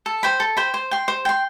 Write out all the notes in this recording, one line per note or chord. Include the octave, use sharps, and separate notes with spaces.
A4
C5 G5 B5
A4
C5 G5 B5
C5
G5 C6
C5
G5 C6